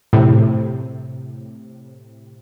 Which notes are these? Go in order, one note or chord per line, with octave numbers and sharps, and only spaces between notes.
A2 C3